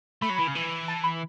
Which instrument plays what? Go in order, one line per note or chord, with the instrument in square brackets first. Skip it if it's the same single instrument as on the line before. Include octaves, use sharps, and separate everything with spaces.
[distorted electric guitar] A3 [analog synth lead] B5
[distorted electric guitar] F#3
E3
C#3
E3
[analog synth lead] A5
B5